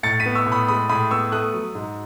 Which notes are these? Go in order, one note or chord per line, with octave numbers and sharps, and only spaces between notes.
A2 A6 C#7
B6 D#7
B3
C#6 E6
A2
B5 D#6
G#3 B5 D#6
A2 B5 D#6
B3 C#6 E6
A3 D#6 F#6
F#3
G#2